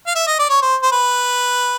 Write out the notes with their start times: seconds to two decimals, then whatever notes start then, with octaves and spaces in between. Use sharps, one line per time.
0.07 F5
0.15 E5
0.27 D#5
0.39 D5
0.49 C#5
0.62 C5
0.82 C5
0.92 B4